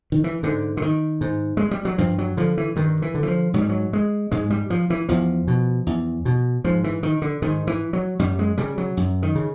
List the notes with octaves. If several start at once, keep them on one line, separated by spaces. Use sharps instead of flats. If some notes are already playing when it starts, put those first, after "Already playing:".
D#3
E3
G#2 D3
D3
D#3
G#2
G#3
G3
F#3
G2 F3
F#3
D3 F3
E3
G2 D#3
E3
D3
E3
F3
G#2 F#3
G3
F#3
G#3
G#2 G#3
G3
F3
E3
E2 F3
B2
E2
B2
G#2 F3
E3
D#3
D3
G#2 D#3
E3
F#3
F#2 G3
G#3
C#3 G3
F#3
F#2
D#3
C#3